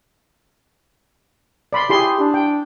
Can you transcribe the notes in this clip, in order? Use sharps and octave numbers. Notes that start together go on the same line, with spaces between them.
D5 B5 C6
E4 G4 G#4 C6
D4
G5